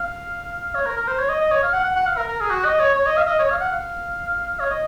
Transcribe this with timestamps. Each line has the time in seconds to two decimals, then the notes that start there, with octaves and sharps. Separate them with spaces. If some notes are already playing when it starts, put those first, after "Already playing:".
Already playing: F5
0.75 C#5
0.86 A#4
0.97 A#4
1.08 C5
1.19 C#5
1.29 D#5
1.41 D#5
1.52 C#5
1.63 F5
1.74 F#5
1.84 F#5
1.96 F#5
2.07 F5
2.18 A#4
2.28 A#4
2.41 G#4
2.51 F#4
2.65 D#5
2.80 C#5
2.95 C#5
3.06 D#5
3.17 F5
3.27 D#5
3.39 C#5
3.51 F5
3.61 F#5
3.73 F5
4.60 C#5
4.71 D#5